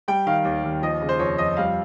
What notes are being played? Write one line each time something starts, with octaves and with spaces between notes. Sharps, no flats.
G3 G5
D#3 F5
D#2
D#2
F3 D#5
C#3
C5
F2 C#5
F2 D#5
G3 F5